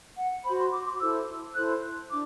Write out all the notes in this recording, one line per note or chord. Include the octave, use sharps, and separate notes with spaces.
F#5
F#4 C5 B5
C6
D6
D6
E4 A4 C5 E6
E4 A4 C5 F#6
D4 D6